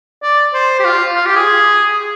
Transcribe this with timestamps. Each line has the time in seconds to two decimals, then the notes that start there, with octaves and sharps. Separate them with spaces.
0.23 D5
0.54 C5
0.80 G4
0.84 F4
1.16 F4
1.26 G4
1.36 G#4